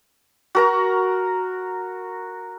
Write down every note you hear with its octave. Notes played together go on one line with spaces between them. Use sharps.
F#4 A#4 A#5